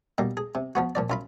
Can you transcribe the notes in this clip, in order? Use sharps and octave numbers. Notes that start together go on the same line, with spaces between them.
B2 G3 A#3
G#4
C3
F3 B3 F#4
A#2 F3 D5
F#2 F4 B5